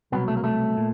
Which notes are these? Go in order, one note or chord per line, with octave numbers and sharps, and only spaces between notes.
C2 B2 F#3 B3
A3
A#3
A3
A#2